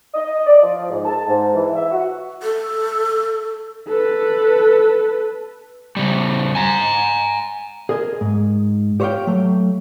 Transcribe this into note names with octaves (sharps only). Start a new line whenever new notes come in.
D#5
D5
F3
G#2
A5
G#2
E3
E5
F#4
A4
A4 B4
C#3 G3
G#5 A#5
G#4 A#4 D#5 G#5
G#2
G4 C5 C#5 E5 F5 G5
F#3 A3